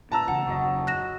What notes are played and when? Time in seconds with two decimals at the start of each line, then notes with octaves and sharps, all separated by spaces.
0.12 A#2 A5 A#5 E6
0.28 E2 C#3 F#5
0.47 D#1 F#2 C#3 F#3 D#5
0.87 F#6 A#6 E7